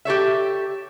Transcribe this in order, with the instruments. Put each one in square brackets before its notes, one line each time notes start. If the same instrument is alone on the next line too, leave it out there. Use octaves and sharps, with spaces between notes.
[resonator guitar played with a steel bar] G4 A4 C#5 E5